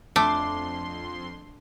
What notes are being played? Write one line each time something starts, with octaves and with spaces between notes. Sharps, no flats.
F2 A3 D4 C6 D6